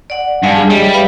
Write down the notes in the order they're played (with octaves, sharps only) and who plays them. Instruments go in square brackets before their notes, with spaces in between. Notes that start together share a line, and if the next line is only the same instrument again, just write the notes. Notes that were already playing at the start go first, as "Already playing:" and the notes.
[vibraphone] D5 F#5
[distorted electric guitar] G2 [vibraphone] F5 G#5 A5
[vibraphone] G#4
[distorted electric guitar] G3 [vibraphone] C#5 D#5 E5
[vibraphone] B4 F5 B5